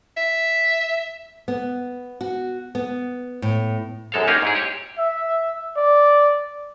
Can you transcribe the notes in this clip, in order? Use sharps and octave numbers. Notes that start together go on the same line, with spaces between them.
E5
B3
F#4
B3
A2
A#1 F#2 G#3 A4 C5 F5
A#3 C#4 D#4 G4 G#4 F5
G#2 E4 G#4
G4 C#5
E5
D5